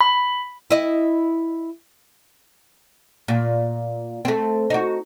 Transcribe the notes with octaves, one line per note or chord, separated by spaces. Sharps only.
B5
E4 D#5
A#2
A3 C4
D#4 F#4